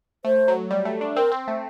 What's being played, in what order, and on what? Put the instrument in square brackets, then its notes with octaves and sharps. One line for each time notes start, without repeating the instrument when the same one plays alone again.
[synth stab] A3 [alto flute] C5
[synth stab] F#3
G3
A3
D4
[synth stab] C4 [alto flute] A#4
[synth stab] C4
A3